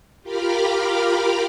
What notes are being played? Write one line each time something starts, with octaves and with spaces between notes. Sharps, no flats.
F4 G4 A#4 B5 D6 F6